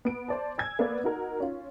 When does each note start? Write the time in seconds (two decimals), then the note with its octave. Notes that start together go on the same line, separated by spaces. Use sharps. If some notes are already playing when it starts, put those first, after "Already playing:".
0.05 B3 D7
0.28 C5 D5 A5
0.58 G#5 E6 G#6
0.79 A#3 B3 B4 D5
1.04 D#4 F#4 A#4
1.40 C#4 F4